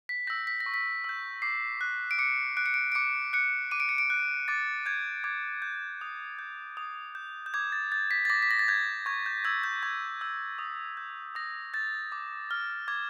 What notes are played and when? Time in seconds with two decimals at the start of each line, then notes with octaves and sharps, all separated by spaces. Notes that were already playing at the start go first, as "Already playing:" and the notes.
0.09 B6
0.27 E6 G6 A#6
0.47 B6
0.60 A#6
0.66 C#6
0.74 B6
1.04 E6 G6
1.42 D6 C7
1.81 F#6
2.11 D7
2.19 D6 C#7
2.57 F#6 D7
2.66 C#7
2.74 D7
2.92 D7
2.95 D6 C#7
3.33 F#6 C#7
3.71 D6 D#7
3.80 D7
3.89 C#7
3.98 D7
4.10 F#6
4.48 D6 A6
4.86 G6 G#6
5.24 D6 G#6
5.62 G6
6.01 D#6
6.39 G6
6.77 D#6
7.15 G6
7.46 G6
7.54 D6 G#6
7.72 A6
7.92 G6 A6
8.11 B6
8.25 A6
8.30 D6 A#6
8.42 B6
8.51 A#6
8.59 A6
8.68 G6 G#6
9.06 C#6 G#6
9.26 G6
9.45 E6 G6 G#6
9.64 G6
9.83 C#6 G#6
10.21 E6 G6
10.59 D#6
10.97 G6
11.35 D#6 A#6
11.74 G6 A6
12.12 D6
12.51 F6
12.88 D6 G#6